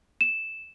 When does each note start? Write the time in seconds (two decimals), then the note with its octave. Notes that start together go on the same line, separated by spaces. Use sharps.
0.21 E7